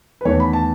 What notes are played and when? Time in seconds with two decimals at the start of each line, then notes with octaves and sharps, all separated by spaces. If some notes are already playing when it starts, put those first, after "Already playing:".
0.21 B4
0.25 E2 D#3 A3 C#5
0.40 B5
0.53 A5